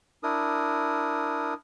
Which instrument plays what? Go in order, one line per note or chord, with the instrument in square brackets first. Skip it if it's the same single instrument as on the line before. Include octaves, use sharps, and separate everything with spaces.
[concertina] D4 E4 A#4 D#6